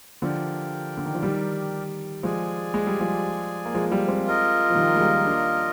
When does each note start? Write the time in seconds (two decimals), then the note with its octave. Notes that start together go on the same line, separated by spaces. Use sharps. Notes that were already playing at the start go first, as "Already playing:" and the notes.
0.22 D3 F3 G4 A#4 D5 G5
0.97 D3
1.06 D#3
1.14 F3
1.22 D#3 G3
2.23 F3 G#3 G#4 D5 G#5
2.74 G#3
2.87 G3
3.00 F3 G#3
3.65 A#3
3.74 F3 G#3
3.92 G3 A#3
4.08 G#3 C4
4.25 F4 A#4 D#5
4.70 F3
4.75 D#3 G3
4.96 G#3
5.01 G3 A#3
5.26 A#3 D4